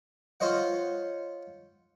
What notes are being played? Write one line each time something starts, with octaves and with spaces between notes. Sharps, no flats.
F4 C5 C#5 D#5 F#5